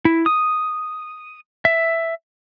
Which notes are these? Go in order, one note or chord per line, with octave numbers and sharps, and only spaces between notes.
E4
D#6
E5